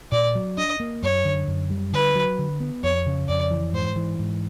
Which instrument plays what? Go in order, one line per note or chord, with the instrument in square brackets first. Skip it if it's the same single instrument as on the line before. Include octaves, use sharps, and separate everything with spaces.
[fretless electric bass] A#2 [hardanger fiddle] D5
[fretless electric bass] F#3
[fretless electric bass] D4 [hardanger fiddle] D#5
[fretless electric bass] A#3
[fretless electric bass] F#2 [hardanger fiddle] C#5
[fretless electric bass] D3
F#2
G3
[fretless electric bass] D3 [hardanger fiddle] B4
[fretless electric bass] F#3
D3
B3
[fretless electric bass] F2 [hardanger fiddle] C#5
[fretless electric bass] C#3
[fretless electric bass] F2 [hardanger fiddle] D5
[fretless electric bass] E3
[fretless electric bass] G#2 [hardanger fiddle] C5
[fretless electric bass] E3
G#2